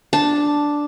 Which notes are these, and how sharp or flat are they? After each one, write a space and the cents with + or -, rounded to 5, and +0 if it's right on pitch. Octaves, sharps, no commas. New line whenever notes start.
D4 +0 A5 +0